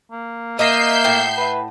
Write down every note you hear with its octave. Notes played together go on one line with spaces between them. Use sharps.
A#3
A#3 A#4 D#5 E5 G6 C7
A2 F#5 G5
B4